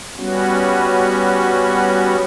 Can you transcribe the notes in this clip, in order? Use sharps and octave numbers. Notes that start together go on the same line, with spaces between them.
G3 B3 C#4 F#4